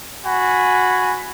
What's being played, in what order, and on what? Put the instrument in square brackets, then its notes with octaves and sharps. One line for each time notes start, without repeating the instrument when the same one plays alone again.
[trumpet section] F#4 G#5 B5